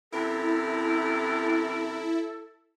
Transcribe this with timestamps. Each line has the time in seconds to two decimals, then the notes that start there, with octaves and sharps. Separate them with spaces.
0.12 F#2 C3 E4 A4 A#4